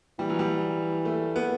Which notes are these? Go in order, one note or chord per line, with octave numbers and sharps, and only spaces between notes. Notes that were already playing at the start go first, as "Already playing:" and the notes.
E3 G3
F#3
G3
A3
B3